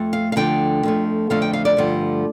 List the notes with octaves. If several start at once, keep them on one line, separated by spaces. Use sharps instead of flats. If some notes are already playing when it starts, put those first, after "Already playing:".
Already playing: F2 A3
F5
F5
D2 D3 F3 G5
F2 F3 A3
F2 D3 F3 A3 F5
G5
F5
D5
G2 D3 F3 A3